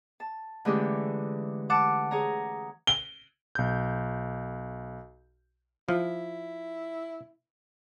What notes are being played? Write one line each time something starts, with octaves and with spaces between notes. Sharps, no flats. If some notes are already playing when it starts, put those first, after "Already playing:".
A5
D3 E3 G#3 A3 C#4 G4
F#5 A5 D6
G#4 C#5 A#5
G7
B1 G6
F3 E4